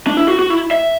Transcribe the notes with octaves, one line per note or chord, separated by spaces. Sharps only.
D4
E4
F#4
F#4
E4
E5